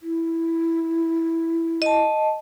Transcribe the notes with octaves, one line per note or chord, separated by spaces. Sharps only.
E4
D#5 A5